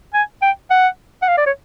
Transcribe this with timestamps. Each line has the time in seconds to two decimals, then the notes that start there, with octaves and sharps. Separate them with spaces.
0.14 G#5
0.42 G5
0.70 F#5
1.22 F#5
1.28 F5
1.37 D5
1.46 C#5